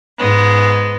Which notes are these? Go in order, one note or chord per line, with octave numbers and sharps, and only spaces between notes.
G#2 G#3 B3